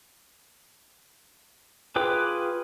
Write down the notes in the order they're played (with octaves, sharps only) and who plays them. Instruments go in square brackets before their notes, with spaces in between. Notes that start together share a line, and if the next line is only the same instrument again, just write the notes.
[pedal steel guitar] F4 G#4 B4 G5 D6